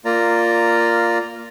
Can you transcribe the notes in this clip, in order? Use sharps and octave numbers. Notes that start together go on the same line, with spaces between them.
A#3 F4 D5 A#5